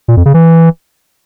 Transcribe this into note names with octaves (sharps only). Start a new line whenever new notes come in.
A#2
F2
C#3
E3